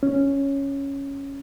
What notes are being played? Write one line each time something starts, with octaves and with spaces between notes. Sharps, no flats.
C#4